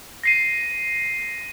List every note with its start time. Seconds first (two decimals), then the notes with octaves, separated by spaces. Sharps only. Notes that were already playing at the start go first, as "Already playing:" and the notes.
0.24 A#6 C7 D#7